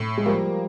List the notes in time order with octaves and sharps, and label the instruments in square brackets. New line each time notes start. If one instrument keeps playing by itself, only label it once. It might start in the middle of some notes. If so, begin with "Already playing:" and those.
Already playing: [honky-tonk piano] A2
[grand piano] G#3
[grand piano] F3 G3 [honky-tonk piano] A#3